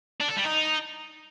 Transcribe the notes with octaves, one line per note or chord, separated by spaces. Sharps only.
D4
A4
G3
D#4